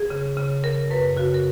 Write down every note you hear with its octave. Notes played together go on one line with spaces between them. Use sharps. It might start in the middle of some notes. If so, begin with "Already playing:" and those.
Already playing: G#4
C#3
C#3
C#3 A#4
F#2 B4
C#3 F#4
A#4